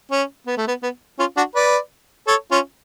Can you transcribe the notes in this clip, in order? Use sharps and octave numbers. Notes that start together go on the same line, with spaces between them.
C#4
B3
A3
B3
B3
C#4 F4
D4 F#4
B4 D5
A4 C#5
C#4 F4